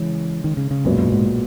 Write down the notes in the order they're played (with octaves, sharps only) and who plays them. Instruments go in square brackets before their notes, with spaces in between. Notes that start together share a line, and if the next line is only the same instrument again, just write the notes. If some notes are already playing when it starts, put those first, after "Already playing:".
Already playing: [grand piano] C#3 G#3 [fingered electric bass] E3
[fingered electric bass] D#3
C#3
C#3
[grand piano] B1 A#2 G#3 B3 F#4 [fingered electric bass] F#2
[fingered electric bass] F#2
G#2